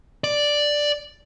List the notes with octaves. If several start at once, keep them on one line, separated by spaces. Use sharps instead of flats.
D5